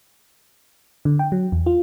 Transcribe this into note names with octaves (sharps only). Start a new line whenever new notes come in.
D3
G5
F#3
E2
F4